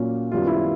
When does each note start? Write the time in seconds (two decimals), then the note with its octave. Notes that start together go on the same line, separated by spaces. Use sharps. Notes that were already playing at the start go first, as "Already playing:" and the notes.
Already playing: A#2 F#3 A#3 C#4
0.31 F#2 D#3 G3 B3 F4
0.47 E4